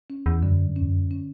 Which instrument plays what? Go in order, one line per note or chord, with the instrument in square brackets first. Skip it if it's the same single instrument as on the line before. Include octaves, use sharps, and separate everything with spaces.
[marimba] C#4
[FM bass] E2
[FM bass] F#2 [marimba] D3
[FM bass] G2
[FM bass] E2 [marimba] C#4
[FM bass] F#2
[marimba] C#4